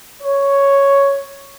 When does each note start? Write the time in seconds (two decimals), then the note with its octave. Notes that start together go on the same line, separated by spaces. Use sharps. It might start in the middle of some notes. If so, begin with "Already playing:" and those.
0.23 C#5